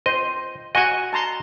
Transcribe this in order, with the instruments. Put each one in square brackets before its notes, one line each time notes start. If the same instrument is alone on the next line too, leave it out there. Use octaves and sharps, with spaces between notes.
[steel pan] C5 [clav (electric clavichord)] D#5
[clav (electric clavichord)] F#4 D#5 [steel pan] F#5 G#5 C#6
[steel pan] A5 A#5 C6